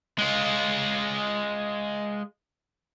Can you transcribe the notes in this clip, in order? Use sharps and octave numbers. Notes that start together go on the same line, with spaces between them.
G#3 F4